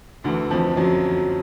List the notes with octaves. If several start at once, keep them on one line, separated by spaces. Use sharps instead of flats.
D2 D3 E3
F2 F3
F#2 F3 F#3